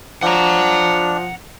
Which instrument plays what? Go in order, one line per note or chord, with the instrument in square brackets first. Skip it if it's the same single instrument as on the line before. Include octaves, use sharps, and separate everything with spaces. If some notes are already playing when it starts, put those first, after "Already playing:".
[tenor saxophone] F3 [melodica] D4 [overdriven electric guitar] F#5 A#5